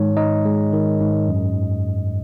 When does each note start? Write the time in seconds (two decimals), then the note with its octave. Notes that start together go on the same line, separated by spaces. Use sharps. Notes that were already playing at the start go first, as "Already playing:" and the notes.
Already playing: G#2 D#3 G#3 D#4 C#5
0.17 D#4 D#5
0.45 G#3
0.73 D#3
1.01 G#2
1.29 F#2